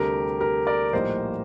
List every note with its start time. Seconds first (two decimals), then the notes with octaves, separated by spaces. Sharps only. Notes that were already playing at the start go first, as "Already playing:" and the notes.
Already playing: D2 C3 G3 D4 G4 A#4
0.40 G4 A#4
0.67 A#4 D5
0.93 A#1 A2 G3 A#3 D#4 C5 D#5